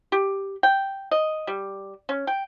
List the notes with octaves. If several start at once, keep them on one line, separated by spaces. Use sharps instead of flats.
G4
G5
D#5
G3
C#4
G5